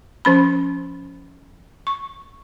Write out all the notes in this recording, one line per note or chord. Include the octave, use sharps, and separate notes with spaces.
F3 C#4 B5
C#6